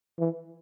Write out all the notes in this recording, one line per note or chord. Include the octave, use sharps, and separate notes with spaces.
E3